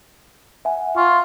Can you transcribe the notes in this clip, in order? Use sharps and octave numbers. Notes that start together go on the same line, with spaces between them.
E5 F#5 G#5
F4 C#6